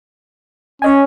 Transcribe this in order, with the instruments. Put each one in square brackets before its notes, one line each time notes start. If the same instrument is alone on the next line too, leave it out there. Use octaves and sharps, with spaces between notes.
[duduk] C#4 [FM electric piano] C#5 D#5 G#5